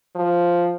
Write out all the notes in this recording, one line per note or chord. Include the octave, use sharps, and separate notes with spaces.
F3